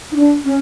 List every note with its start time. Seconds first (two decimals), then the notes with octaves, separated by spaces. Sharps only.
0.12 D#4
0.16 D4
0.45 C#4